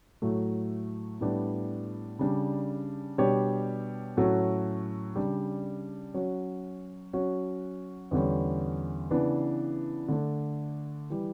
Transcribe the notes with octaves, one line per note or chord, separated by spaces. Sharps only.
A2 F#3 A3
A2 G3 B3 D4
C#3 G3 D4
B2 G3 D4 G4 C#5
A2 F#3 C#4 F#4 A4
C#3 G3 D4
F#3 C#4 F#4
F#3 C#4 F#4
E2 D3 G3 C#4
C#3 E3 B3 D4
D3 A3 D4
E3 G3